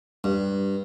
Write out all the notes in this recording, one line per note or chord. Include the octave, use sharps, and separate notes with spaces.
G2